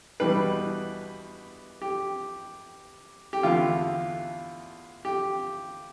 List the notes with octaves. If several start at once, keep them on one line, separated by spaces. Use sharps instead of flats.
E2 B2 G3 D4 B4
G4
G4
E2 D3 A3 F4
G4